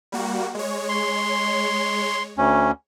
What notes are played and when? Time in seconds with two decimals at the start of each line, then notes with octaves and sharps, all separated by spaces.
0.12 G3 A#3 F#4
0.55 G#3 C#5
0.89 C6
2.38 D2 C#4